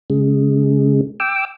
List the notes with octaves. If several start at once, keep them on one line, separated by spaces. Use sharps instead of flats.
C#3 G#3
G5 D6 E6